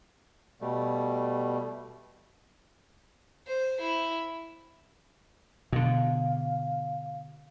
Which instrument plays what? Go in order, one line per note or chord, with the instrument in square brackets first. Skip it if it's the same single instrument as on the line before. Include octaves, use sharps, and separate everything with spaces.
[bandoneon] B2 G3 A3
[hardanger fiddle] C5
E4
[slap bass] B2 D3 [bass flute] F5